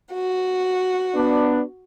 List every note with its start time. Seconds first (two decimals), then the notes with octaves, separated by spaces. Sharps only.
0.13 F#4
1.15 B3 D4